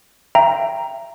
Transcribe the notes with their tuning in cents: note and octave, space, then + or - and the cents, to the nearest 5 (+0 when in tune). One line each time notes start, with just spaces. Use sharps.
E5 +35 G5 +0 A#5 +0